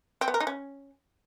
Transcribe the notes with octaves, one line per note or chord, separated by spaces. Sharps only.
C4
B3
A#4
D#4
C#4